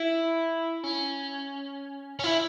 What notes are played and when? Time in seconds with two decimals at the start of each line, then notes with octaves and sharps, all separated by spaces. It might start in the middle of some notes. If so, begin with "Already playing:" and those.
Already playing: E4
0.84 C#4
2.20 C#4
2.24 E4